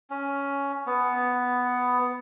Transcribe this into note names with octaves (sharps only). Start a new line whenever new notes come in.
C#4
B3